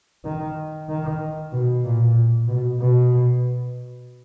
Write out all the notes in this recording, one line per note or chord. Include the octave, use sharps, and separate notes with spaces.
D#3
D#3
B2
A#2
B2
B2